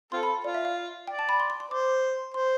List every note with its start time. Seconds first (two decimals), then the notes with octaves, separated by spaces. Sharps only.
0.12 C4 F4 A4 C6
0.23 B5
0.44 F4 D5
0.55 E5
0.65 F5
1.07 D5 G5
1.19 A5
1.29 B5
1.40 C6
1.50 C6
1.60 C6
1.71 C5 D6
2.34 C5 C6